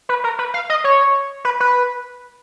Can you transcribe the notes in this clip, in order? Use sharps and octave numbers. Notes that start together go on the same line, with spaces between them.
B4
A#4
B4
F5
D#5
C#5
B4
B4